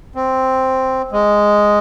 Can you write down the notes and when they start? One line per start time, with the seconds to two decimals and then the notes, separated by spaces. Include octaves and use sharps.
0.15 C4
1.12 G#3